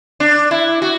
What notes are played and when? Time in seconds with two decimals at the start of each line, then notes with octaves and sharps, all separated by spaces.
0.20 D4
0.51 E4
0.82 F#4